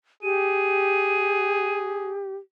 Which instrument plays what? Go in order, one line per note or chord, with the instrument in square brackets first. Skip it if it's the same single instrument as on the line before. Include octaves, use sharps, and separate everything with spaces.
[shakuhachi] G4 [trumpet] G#4 [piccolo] D#7